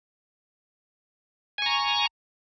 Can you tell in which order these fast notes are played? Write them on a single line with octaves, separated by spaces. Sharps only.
G#5 C#6 A#5